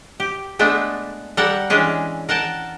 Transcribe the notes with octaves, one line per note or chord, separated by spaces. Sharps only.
G4
G#3 A3 B3 D4
G3 A4 A#4 F#5
E3 G#3 C#4 D4
A#4 F#5 G5 A5